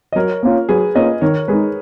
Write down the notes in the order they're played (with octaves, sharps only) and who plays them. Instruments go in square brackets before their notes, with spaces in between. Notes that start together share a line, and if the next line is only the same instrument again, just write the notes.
[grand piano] D#5
[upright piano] F#3 [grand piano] A#4 C#5
[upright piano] A#3 C#4 F4
[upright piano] F#3 [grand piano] G#4 B4
[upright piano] A#3 C#4 F4 [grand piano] B4 D#5
[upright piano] D#3 [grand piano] A#4 C#5
[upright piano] G#3 D#4 [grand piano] G#4 B4